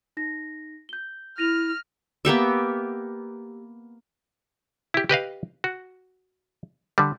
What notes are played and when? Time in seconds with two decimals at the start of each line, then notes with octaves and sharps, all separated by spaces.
0.17 D#4 A#6
0.89 G6 G7
1.38 E4 F6 A#6 D#7 F7
2.25 A#3 B3 G4 E5
4.94 E4 G4
5.09 G4 B4 D#5 F5
5.64 F#4
6.98 D3 G3